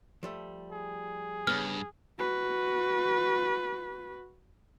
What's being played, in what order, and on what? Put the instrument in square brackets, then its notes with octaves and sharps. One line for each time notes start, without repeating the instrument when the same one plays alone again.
[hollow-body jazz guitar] F3 G3 A3
[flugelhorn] G#4
[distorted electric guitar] G2 [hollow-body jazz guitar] C#3 B3 [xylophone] F6
[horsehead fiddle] F#4 B4